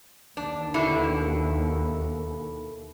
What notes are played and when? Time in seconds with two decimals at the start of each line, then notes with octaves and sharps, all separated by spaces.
0.37 D#2 D4
0.74 B2 D3 E4